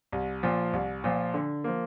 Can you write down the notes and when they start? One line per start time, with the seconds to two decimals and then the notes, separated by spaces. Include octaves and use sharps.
0.12 C2
0.43 A#2 F3
0.73 C2
1.04 A#2 F3
1.34 D3
1.64 F3 A#3